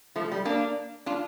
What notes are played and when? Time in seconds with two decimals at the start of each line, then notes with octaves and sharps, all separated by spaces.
0.16 F3 A3
0.32 G3
0.45 A#3 D4
1.06 D4 F4